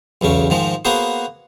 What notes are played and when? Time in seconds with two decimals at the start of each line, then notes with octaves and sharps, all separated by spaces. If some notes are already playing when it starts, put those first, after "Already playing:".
0.21 B1 E2 C#3 C#4
0.50 G#2 D#3 F3 G#3
0.85 A#3 B3 F#4 G#4 C5